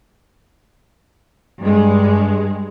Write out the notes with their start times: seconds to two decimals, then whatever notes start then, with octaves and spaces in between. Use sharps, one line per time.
1.61 G2 G#3